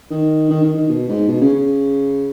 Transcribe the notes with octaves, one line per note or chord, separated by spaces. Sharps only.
D#3
D#3
D#3
D#3
B2
G#2
B2
C#3
C#3